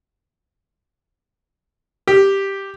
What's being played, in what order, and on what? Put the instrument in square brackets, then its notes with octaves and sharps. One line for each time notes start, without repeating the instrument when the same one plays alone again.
[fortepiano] G4